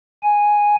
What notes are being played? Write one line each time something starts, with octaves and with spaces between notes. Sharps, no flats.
G#5